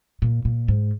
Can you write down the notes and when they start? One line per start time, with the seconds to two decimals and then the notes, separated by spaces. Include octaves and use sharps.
0.22 A#2
0.45 A#2
0.68 G#2